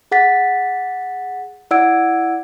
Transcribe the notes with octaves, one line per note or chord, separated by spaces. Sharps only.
G#4 F#5 A6 B6
E4 D5 F#5 E6 G#6 D7